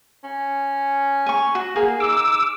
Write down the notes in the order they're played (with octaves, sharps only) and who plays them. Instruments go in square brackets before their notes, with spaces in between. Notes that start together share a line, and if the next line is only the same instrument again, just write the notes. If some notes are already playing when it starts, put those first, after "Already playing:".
[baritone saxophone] C#4
[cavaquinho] G#5 C#6
F#4
[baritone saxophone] A#3 [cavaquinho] G#4
[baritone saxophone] D#4 [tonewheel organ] D6 E6